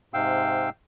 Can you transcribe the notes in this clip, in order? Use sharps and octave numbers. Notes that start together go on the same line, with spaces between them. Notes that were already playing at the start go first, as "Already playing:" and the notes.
G#2 C3 F5 G5 E6